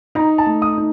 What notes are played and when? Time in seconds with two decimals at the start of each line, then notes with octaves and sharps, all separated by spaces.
0.15 D#4 A#5
0.38 A5
0.46 A3
0.62 D#6
0.78 D#4